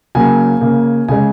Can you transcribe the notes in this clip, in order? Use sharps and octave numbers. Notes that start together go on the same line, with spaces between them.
C#3 F#3 A#3 G#5
C#3 A#3
C#3 G#3 G#5